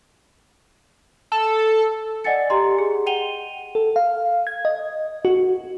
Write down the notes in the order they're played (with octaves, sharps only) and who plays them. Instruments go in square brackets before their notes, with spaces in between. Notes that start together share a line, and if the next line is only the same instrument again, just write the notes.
[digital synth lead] A4
[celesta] D5 D#5 F#5 G#5 A6 C#7
G4 D#5 A#5 C6
G#4
F#5 G5 D#7 F7 G7
[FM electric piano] A4
F5
G#6
D#5
F#4